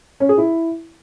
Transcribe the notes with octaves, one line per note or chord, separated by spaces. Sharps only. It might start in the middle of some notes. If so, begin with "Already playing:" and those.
C#4
G#4
E4